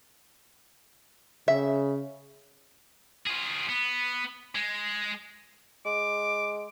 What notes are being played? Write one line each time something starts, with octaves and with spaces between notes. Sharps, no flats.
C#3 E5
F4 G#4
B3
G#3
G#3 D6